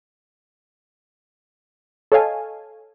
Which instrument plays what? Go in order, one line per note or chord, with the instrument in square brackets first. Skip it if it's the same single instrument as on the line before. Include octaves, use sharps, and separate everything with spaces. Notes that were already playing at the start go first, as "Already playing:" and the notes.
[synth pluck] A4 C#5 D#5 F5 G#5 A5